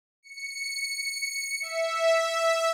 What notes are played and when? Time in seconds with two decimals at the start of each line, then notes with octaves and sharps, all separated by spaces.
0.23 C#7
1.61 E5